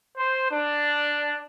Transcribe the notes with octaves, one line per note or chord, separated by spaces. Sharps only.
C5
D4